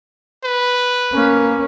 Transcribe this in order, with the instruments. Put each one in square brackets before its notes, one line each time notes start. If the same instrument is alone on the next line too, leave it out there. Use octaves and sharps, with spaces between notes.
[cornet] B4
[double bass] A#3 C#4